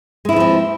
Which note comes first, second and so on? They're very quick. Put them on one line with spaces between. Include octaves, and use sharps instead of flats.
G#3 E4 E3 F3 C4